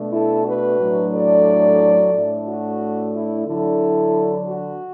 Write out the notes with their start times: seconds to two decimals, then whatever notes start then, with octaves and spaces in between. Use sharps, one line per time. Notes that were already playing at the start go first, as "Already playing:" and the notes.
Already playing: B2 A3 D4
0.12 E4 A4
0.45 F#4 B4
0.79 A2 F#3 A3 D4
1.13 A4 D5
2.13 A2 A3 D4
2.46 F#4
3.13 E4
3.47 D3 F#3 D4 E4 A4
4.48 F#4